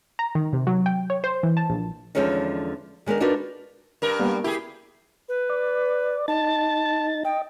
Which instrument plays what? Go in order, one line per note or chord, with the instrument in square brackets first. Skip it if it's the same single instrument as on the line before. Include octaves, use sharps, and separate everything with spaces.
[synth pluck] A#5
D#3
C3
F#3
G5
C#5
C5
E3
A5
A#1
[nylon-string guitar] E2 D3 F3 G#3 C#4 D#4
D#3 G#3 B3 D4 A#4
D4 D#4 F4 F#4 A#4 B4
[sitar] G2 A#4
[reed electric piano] G3 A#3 B3
[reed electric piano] E4 B5 [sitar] G4 G#4
[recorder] B4
[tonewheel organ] D5
[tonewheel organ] D#4 A6 [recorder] A5
[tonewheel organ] D#5 [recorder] G5